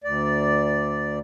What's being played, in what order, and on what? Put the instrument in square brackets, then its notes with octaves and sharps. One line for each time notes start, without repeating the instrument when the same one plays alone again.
[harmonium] D2 D5